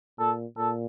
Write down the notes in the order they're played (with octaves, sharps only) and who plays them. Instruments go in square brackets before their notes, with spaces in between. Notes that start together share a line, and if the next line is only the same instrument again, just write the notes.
[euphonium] A#2 [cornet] A4
[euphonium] A#2 [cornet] A4